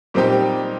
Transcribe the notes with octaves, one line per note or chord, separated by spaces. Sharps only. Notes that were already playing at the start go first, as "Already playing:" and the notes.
A#2 G3 C4 D#4 G4